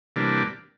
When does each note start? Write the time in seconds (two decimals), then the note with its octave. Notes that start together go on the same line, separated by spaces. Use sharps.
0.16 C3 E3 G3 A#3 D4